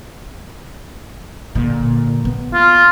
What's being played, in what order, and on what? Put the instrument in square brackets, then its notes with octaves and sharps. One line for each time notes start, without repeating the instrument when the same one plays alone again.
[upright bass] A#2 D3
B3
[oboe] F4